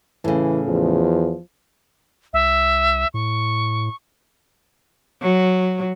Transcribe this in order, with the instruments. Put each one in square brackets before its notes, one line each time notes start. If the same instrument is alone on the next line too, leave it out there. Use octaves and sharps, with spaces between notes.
[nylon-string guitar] A2 C#3 [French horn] E3
[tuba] E2 [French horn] F3
[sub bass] C2 [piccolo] E5
[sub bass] A2 [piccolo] C#6
[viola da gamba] F#3